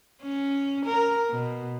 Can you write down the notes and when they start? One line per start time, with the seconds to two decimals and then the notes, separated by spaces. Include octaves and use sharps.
0.23 C#4
0.86 A#4
1.30 B2